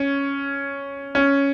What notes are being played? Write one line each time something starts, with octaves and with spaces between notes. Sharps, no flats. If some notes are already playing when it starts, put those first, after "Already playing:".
Already playing: C#4
C#4